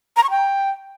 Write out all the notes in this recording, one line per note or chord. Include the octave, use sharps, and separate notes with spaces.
A#5
C#6
G5